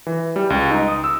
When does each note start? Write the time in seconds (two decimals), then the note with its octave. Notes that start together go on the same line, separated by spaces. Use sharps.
0.07 E3
0.36 G3
0.50 C#2
0.71 D#4
0.88 D#6
1.04 E6